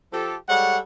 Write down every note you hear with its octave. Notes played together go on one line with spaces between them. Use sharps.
F3 G4 A4
G3 G#3 A4 C#5 F#5